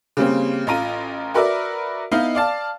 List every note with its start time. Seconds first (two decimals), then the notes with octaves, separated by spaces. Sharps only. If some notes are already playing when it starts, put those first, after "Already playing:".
0.17 C#3 G3 A#3 C4
0.67 A1 F4 A#5 D#7
1.34 F#4 A#4 B4 D5 E5
2.12 B3 D#4 E4 D#5 F5
2.35 D5 F5 A5